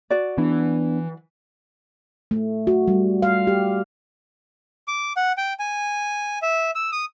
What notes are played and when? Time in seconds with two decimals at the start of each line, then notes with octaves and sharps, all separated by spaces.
0.10 F#4 D5
0.38 E3 B3 D4
2.31 A3
2.67 F#4
2.88 G3
3.22 F5
3.47 G4
4.88 D6
5.17 F#5
5.37 G5
5.59 G#5
6.42 E5
6.75 E6
6.92 D#6